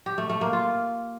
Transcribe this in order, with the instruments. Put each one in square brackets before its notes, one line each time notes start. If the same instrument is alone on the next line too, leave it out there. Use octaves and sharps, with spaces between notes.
[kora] G4
A3
A3
A#3
F4